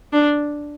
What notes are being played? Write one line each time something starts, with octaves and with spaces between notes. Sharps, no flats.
D4